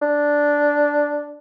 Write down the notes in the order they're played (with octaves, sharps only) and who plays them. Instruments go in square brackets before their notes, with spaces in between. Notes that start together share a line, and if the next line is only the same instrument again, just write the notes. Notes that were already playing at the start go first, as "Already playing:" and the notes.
[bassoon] D4